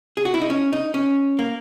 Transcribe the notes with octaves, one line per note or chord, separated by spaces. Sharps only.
G#4
F#4
E4
D#4
C#4
D#4
C#4
A#3